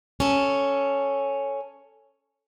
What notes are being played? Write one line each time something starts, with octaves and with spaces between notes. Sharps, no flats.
C#4 A4